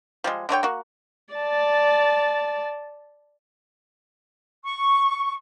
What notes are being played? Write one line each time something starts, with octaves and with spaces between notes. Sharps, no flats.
F3 G3 G#3
D3 A3 C#5 G5
A#3 F#4
D5 A5
C#6